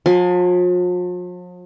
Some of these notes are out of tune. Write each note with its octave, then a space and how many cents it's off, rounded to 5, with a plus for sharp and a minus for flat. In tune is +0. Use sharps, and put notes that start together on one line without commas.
F3 +45 G#5 +5 C6 +10